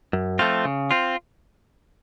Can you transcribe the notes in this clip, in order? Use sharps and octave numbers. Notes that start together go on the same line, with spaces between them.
F#2
F3 A3 C4 F4
C#3
C4 F4